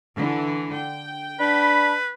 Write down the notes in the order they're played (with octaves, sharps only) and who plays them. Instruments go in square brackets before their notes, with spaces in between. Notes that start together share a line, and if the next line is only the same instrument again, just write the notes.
[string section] D3 E3
G5
[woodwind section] D4 B5 [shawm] B4